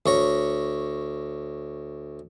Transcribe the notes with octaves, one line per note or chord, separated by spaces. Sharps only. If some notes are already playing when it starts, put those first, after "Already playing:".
D2 C#5 A#5